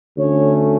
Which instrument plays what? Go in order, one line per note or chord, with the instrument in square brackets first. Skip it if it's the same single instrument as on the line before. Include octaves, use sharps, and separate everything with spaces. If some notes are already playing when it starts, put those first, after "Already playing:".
[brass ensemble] D2 D3 A3 C#4 C#5